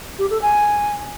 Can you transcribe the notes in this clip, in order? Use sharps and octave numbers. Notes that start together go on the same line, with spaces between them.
G4
A4
G#5